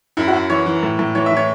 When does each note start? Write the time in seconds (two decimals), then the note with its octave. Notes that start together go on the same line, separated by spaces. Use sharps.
0.17 F#2 E4
0.28 F#4
0.33 F#2
0.50 E3 C#5
0.66 E3
0.83 A2
0.99 A2
1.15 E3 C#5
1.26 E5
1.32 E3 C#5